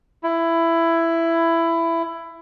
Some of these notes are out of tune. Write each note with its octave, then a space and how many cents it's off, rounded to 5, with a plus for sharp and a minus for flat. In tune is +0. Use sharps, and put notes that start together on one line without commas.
E4 +15